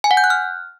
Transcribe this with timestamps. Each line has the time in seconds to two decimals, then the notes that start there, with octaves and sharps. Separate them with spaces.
0.04 G#5
0.11 F#5
0.17 G6
0.24 F#6
0.30 F6